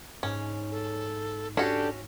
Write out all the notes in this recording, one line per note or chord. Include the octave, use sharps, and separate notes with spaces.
G#2 C#4
A4
C#4 D4 F#4 G4 A4